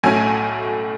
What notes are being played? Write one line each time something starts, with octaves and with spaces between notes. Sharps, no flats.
B1 A2 F#3 A3 C#4 G#5